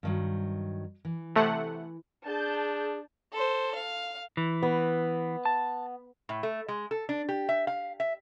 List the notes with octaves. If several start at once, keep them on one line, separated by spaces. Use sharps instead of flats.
G2 D#3 F#3
E3
C3 A3 F#5
D4 G#4 A5 G6
A4 C5
F5
E3
B3
A5
A2
A3
G#3
A4
D4
G4
E5
F5
E5